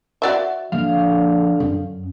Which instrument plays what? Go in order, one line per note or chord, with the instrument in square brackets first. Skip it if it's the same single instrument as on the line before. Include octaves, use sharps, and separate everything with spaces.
[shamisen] F#4 D5 E5
[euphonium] D3 [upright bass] F3 A#3 [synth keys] F5
[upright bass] F#2